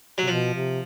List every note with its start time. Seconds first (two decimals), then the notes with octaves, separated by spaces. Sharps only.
0.18 C3 F#3
0.28 B2 F3
0.54 C3